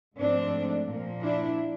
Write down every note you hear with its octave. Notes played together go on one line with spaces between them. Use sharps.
G#2 F3 A3 C4 D4
A#2 F3 A#3
D4 E4